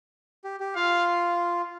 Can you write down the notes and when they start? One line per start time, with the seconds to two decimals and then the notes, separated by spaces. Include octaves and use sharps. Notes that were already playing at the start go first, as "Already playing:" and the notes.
0.44 G4
0.60 G4
0.76 F4 F5